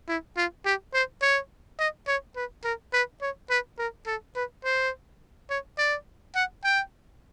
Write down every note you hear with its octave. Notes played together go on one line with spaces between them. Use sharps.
E4
F4
G4
C5
C#5
D#5
C#5
B4
A#4
B4
C#5
B4
A#4
A4
B4
C5
C#5
D5
F#5
G5